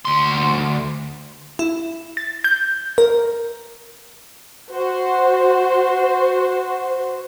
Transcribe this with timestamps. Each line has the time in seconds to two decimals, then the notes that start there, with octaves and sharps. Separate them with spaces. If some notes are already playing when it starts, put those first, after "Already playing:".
0.05 D2 C6
1.59 E4
2.17 A6
2.44 G6
2.98 A#4
4.71 F#4 C5